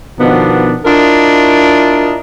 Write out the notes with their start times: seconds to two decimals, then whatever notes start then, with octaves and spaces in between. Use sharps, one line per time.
0.19 B2 D#3 F3 B3 D4
0.85 D4 E4 F4 A#4 D#5